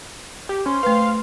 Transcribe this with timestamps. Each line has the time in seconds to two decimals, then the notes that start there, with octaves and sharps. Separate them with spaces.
0.49 G4
0.66 C#4 C5
0.83 A3 B4 F5